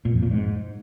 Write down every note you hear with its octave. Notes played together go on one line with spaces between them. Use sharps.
A#2
F2
A#2
G#2